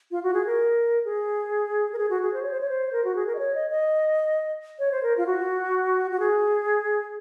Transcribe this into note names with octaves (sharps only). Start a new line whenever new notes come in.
F4
F#4
G#4
A#4
G#4
A#4
G#4
F#4
G#4
C5
C#5
C5
C#5
C5
A#4
F#4
G#4
A#4
D#5
C#5
D#5
D#5
C#5
C5
A#4
F4
F#4
F#4
G#4